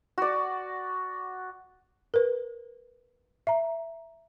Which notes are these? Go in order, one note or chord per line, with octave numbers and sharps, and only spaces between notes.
F#4 D5
A#4 B4
E5 A#5